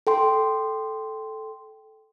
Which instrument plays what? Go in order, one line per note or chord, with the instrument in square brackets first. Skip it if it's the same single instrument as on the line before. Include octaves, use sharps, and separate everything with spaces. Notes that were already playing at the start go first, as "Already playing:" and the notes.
[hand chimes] A4 G5 C6